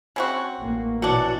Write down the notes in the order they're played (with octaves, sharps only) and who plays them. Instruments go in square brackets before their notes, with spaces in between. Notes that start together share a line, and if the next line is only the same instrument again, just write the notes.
[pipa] C#3 C4 F#4
[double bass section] A1 A#3
[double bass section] B2 E3 [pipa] F#3 D4 [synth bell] F#4